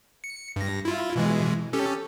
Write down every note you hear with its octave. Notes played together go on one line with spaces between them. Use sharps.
C#7
G2 A#6
E4 F4
B2 E3 G#3
C#4 G4 A4